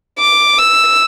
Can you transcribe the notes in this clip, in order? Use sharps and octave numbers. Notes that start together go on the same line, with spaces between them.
D6
E6